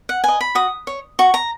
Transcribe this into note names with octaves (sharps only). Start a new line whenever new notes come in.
F#5
B4 D#5 G#5
B5
F#4 D#6
C#5
F#4 C#6
A#5